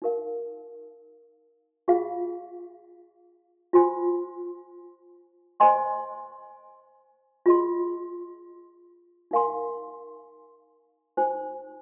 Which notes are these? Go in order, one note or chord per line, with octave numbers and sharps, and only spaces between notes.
D#4 A#4 F5
F4 G#4 F5
F4 C5 G#5 C6
C5 D#5 G#5 C6
F4 G#4 D#5 C6
D#4 A#4 F5 G#5 C6
D#4 C5 G#5